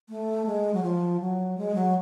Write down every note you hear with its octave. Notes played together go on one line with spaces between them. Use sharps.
A3
G#3
F#3
F3
F#3
G#3
F#3